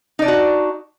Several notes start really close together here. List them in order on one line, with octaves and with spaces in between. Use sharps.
D#4 D5 D4 F#4